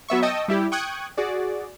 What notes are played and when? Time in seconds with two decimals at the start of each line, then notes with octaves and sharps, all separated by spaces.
0.08 F#3 B3 E5 C#6
0.22 D#5 G5 A5 C#6 D#6 E6
0.48 G3 E4 G4
0.72 G5 C#6 D#6 F#6 G#6
1.17 F#4 G#4 D5